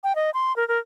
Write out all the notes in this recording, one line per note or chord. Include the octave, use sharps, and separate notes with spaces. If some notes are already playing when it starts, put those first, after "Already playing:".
G5
D#5
C6
A#4
A#4